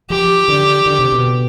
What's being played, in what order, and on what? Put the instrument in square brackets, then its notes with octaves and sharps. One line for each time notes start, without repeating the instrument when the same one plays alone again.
[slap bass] F3 [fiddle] G4
[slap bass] D3
D3
C3
B2